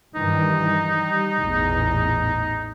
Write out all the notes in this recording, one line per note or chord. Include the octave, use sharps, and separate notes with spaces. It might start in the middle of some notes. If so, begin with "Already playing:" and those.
G2 D#3 E3 D#4
G3
A1 E2 A#2